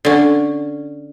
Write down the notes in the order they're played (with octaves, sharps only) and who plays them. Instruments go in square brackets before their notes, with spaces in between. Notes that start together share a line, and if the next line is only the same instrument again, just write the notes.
[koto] D3 C#4